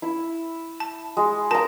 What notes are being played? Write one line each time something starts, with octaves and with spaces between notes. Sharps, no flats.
E4
A5
G#3
A#4 A5 A#5